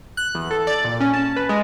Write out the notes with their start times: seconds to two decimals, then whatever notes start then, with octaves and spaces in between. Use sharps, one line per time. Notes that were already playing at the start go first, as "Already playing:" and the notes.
0.17 F#6
0.35 E2
0.51 A4
0.67 D5
0.84 A#2
1.00 C#4
1.13 A5
1.36 B4
1.49 G#3